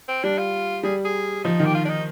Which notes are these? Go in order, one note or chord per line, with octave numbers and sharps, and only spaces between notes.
C4
G3 D4
F4
G3 G#4
G#4
F3 D#4
D#3
G4
F4
D4
D#4